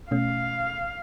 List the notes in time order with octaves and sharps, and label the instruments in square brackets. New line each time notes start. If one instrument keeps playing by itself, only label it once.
[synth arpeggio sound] B2 A3 C#4 [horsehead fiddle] F5